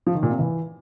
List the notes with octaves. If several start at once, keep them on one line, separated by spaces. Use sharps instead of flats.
F3
D#3
A#2
C3
E3